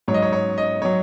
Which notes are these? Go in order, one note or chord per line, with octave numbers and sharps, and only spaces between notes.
G#2 F#3 C#5
D#5
C#5
C#5
D#5
F#3 C#5